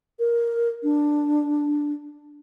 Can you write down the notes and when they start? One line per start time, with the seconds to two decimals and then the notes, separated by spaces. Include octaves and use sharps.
0.19 A#4
0.83 D4